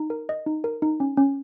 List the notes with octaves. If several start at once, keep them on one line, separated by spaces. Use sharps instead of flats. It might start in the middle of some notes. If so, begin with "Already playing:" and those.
Already playing: D#4
A#4
D#5
D#4
A#4
D#4
C#4
C#4